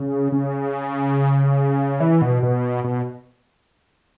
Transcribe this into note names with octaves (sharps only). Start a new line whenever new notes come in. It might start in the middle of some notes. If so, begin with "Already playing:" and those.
Already playing: C#3
C#3
E3
B2
B2
B2